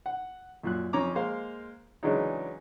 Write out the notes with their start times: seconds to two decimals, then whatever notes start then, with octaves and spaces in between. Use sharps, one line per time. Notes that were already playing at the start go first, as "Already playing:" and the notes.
0.06 F#5
0.63 F#2 A#2 F#6
0.93 F2 C#4 A#5 D6
1.15 G#3 A#3 C5 F5
2.03 C#3 E3 F#3 G#3 D4 D#4